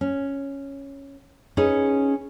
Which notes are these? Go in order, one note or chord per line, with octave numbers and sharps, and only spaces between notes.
C#4
C#4 D#4 G#4 B4